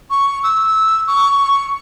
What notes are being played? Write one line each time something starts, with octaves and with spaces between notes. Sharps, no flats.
C#6
E6
C#6